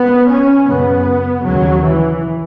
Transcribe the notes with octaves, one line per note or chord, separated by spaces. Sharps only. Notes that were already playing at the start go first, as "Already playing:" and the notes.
Already playing: B3
C#4
F#2 C#3 B3
D#2 C#3 F#3
E3